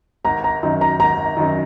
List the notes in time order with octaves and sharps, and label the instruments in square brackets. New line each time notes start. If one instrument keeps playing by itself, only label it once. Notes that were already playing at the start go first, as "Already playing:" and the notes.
[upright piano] G#1 [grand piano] A#5
[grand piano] A#5
[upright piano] F#2 D#3
[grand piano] A#5
[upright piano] G#1 [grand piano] A#5
[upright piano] F#2 D#3